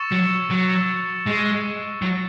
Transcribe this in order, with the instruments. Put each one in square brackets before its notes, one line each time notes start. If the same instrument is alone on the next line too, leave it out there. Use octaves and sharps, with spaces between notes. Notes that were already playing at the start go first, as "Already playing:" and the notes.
Already playing: [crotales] C#6 E6 A6 C#7 E7
[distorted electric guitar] F#3
F#3
G#3
F#3